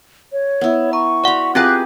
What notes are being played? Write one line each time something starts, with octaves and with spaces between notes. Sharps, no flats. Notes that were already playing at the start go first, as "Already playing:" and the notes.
C#5
B3 E4
A#5 C#6
F#4 D5 F#5 B5 C6
C4 F4 G4 G#4 B4 G5 F#6